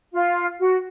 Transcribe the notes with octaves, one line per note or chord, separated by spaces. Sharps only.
F4
F#4